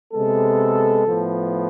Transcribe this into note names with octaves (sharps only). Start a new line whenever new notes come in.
C3 G#3 B3 A4
A2 F3 B3